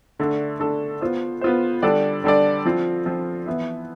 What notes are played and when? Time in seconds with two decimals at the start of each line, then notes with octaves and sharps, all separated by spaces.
0.19 D3 A3 D4 A4
0.59 D3 A3 D4 A4
1.01 B3 F4 C5
1.41 B3 F4 C5
1.82 D3 G3 D4 A4 D5
2.24 D3 G3 D4 A4 D5
2.65 F3 C4 F4
3.06 F3 C4 F4
3.46 E3 B3 E4